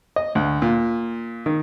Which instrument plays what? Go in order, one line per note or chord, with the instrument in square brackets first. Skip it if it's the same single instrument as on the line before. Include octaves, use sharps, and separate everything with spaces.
[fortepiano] D#5
D2
A#2
D#3